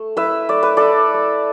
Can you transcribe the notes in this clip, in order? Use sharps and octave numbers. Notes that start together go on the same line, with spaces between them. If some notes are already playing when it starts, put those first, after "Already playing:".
Already playing: A3
E4 B4 E5
A3 D5
B4
E4 A4 D5
A3